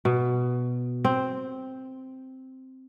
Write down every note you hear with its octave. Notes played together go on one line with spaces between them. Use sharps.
B2
C4